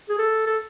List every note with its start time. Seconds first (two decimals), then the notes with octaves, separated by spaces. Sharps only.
0.09 G#4
0.19 A4
0.47 A4